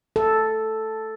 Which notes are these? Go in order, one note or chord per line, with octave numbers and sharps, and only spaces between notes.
A4